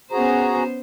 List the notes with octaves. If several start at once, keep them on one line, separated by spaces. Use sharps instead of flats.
B3 C#4 F#4 G#4 C5 A#5